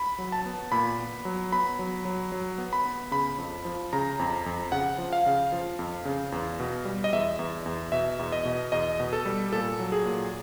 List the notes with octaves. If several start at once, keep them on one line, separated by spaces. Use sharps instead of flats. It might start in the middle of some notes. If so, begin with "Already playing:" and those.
Already playing: B5
F#3
A5
B3
A#2 B5
B3
F#3
B3 B5
F#3
F#3
F#3
B3
B5
B3
C#3 B5
F2
F3
C#3 A#5
F2
F2
C#3 F#5
F3
F5
C#3
F3
F2
C#3
E2
B2
G3
D#5
E2 E5
E2
E2
B2 E5
E2
D#5
B2
E2 D#5
B2
A4
G3
A#2 A4
F#3
G#4
A#2